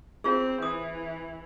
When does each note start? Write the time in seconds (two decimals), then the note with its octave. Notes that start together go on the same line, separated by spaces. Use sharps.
0.24 C4 F4 G#4
0.62 E3 D#6